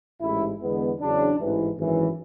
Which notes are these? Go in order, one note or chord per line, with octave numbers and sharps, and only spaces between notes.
A1 G#2 G#3 E4
E2 D3 G#3 B3
E2 C#3 F#3 D4
A1 G#2 E3
G#1 F#2 E3